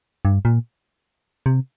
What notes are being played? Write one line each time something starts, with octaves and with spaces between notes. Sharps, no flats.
G2
A#2
C3